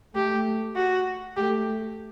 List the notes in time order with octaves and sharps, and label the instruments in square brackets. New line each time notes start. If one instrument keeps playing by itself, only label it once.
[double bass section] A3 [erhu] G4
[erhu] F#4
[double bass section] A3 [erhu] G4